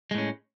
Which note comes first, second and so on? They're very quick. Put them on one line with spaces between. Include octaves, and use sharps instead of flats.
G#3 A2 C#4